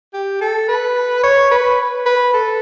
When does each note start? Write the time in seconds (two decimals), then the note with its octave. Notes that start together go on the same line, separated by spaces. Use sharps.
0.13 G4
0.41 A4
0.68 B4
1.24 C#5
1.51 B4
2.06 B4
2.33 A4